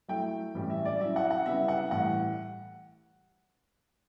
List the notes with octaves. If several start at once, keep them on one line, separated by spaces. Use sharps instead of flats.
F#3 A3 E4 G5
A2 E3 G3 C#4 E4
E5
D5
F#3 C#4 E4 E5
F#5
F#5
C#3 G3 B3 E4 E5
F#5
A2 E3 G3 F#5